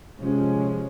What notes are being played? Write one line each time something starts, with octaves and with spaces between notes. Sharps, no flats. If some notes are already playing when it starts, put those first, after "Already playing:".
C3 F3 G#3 C#4